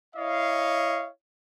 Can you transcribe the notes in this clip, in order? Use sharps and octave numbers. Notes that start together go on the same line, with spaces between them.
E4 C#5 D#5 F5